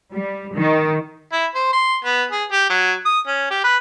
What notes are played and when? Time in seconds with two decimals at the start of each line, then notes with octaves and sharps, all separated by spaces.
0.13 G3
0.57 D#3
1.33 E4
1.55 C5
1.73 C6
2.05 B3
2.31 G#4
2.52 G4
2.70 F#3
3.06 D#6
3.27 C#4
3.51 G4
3.64 B4